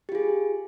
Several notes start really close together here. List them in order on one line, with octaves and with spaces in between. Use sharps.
G4 F4 G#4